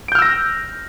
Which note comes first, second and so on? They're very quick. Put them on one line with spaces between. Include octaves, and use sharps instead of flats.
D7 G6 F6 E6 A#6